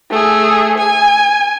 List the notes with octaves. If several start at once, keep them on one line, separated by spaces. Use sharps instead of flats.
A3 G#4
G#5